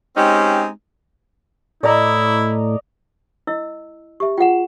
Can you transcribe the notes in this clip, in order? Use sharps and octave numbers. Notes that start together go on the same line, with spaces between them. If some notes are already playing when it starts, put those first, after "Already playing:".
G#3 C4 C#4 D#4 G4
A2 E4 D5 D#5 A#5
E4 D#5 E6
G4 E5 C#6
F4 G#4 F#5 G5 E7